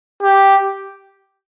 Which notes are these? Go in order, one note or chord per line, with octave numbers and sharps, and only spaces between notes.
G4